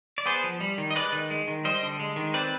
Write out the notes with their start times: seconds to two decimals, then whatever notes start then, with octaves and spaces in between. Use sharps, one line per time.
0.18 D5
0.26 B3 G#4 C5
0.44 F3
0.60 G3
0.78 D#3
0.91 D#5
0.95 G#3 B4 D5
1.12 D#3
1.30 G#3
1.47 D#3
1.64 G3 C5 D#5
1.83 D3
1.99 G#3
2.16 D#3
2.34 C4 B4 D5